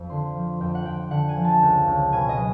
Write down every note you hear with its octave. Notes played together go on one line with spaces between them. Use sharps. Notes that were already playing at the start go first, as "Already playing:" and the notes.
Already playing: F2
D3 C6
F3
F2 G5
F#5
F2 G5
D3 F#5
G#5
F3
A5
C#2 G5
C#2
B2 G#5
D#5
F#3